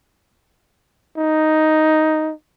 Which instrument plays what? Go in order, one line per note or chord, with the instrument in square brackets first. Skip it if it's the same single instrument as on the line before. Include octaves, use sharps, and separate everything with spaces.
[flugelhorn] D#4